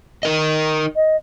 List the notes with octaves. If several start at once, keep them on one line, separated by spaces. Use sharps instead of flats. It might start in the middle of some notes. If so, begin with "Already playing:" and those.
D#4 A#4 D#5
D#5